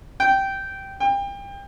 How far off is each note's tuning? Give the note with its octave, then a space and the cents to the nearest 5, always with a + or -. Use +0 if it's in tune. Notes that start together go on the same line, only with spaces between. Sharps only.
G5 -10
G5 +30